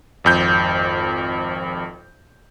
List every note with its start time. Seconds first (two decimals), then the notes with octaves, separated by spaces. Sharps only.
0.24 G#1 F2 G6